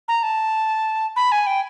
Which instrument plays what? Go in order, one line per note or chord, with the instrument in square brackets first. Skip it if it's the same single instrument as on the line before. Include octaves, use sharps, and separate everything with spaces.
[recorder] A#5
A5
B5
G#5
G5